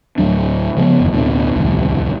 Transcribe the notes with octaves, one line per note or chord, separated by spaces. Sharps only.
D1 F2 F#3 D4
C#3 F3 F#3 B3
F#1 D#2
D1 B2 D3
D1 C2 F2 D#3